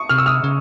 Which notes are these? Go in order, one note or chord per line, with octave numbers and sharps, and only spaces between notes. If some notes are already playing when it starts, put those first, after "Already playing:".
Already playing: C#6 D#6
C3 F6
E6
D#6 F6
C#3